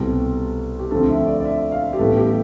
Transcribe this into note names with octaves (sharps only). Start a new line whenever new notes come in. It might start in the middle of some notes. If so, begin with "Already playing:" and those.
Already playing: C2 B2 G3 C4 A4
G4
D2 D3 F3 C4 A4
E5
D5
D5
E5
F5
G4
A1 A2 G3 B3 A4
G4